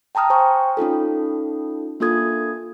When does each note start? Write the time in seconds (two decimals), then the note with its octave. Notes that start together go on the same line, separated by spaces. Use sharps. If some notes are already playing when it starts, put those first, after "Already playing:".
0.15 G5 A5 A#5 D#6 F6
0.30 C5 G5 G#5 C#6
0.77 C#4 D#4 F4 A4
2.00 A#3 D4 F4 A4 D#6 G#6